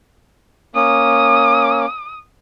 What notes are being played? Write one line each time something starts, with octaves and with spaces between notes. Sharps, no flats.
A#3 C#4 D#6